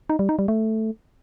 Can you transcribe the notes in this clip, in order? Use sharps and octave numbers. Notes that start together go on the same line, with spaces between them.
D#4
G3
D#4
G3
A3